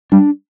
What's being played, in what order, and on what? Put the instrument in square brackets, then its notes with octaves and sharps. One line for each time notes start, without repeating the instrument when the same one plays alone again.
[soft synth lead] G3 [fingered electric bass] D4